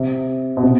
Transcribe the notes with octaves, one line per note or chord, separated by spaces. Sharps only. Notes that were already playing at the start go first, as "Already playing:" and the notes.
Already playing: C3
B2
C3